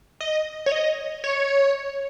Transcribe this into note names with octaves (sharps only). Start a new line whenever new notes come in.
D#5
C#5
D#5
C#5